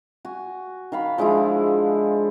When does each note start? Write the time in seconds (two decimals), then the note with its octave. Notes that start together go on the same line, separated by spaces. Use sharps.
0.25 F#4 G#5
0.92 D#3 F5 B5
1.18 F3 G#3 D4 E4